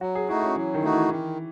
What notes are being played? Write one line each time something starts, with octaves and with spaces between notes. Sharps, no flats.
F#3 F#4
G#4
A3 D#4 E4 F#4
C#4
E3 F#3
D#3
A3 D#4 F#4
E3
D#3 E3